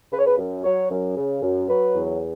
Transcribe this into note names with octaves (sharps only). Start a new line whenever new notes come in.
C#3 B4
C#5
B4
F#2
F#3 C#5
F#2
C#3
F#2
F#3 B4
E2